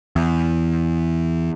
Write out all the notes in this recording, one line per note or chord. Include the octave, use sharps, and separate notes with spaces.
E2